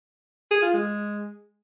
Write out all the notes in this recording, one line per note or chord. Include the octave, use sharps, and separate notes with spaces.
G#4
F4
G#3